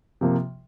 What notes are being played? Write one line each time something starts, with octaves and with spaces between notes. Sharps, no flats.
C3 F3 A#3